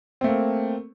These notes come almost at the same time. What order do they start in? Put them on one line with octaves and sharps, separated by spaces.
C4 A3 A#3